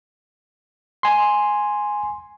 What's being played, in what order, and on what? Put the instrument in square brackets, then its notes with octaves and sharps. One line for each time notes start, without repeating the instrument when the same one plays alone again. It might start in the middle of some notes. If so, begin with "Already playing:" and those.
[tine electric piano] G#5 C6